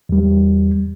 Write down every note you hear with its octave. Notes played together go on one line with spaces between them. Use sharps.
E2 G3